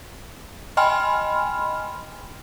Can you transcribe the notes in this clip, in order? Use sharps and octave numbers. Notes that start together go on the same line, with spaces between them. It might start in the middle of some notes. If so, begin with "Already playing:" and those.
D#5 G5 G#5 B5 C6 F6